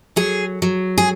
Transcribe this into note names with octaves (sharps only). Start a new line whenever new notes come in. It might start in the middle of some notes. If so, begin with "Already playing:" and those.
F#3 G#4
F#3
G#4